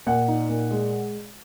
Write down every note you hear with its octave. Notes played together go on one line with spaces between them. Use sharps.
A#2 F#5
D#4
A#2
G#3